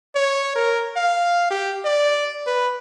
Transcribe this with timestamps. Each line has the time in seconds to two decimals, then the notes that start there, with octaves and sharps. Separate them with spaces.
0.15 C#5
0.55 A#4
0.96 F5
1.50 G4
1.85 D5
2.47 B4